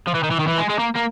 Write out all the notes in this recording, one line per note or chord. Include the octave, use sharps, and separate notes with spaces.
F3
E3
D#3
E3
D#3
E3
G#3
G#3
A#3
A#3